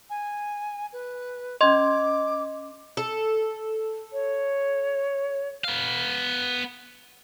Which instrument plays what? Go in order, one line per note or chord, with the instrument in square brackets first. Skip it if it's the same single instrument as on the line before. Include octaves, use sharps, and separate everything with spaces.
[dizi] G#5
B4
[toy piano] C#4 C6 [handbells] D#5 G#6 [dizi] D6
[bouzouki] A4
[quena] C#5
[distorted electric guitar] B3 F5